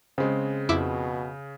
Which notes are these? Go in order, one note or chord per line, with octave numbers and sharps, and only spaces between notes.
C#3 G#3 C4
F2 B2 E4 D6